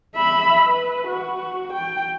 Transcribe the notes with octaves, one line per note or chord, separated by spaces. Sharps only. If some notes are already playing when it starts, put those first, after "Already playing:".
E5 B5
B4
F#4
G5